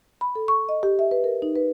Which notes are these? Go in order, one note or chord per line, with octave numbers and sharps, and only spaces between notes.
B5
A4
C#6
D#5
G4
E5
B4
A#4
D#4
B4